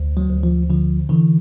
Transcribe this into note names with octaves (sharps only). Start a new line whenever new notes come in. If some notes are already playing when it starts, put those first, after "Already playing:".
Already playing: D2
F#3
D2
F3
D3 F3
D3 E3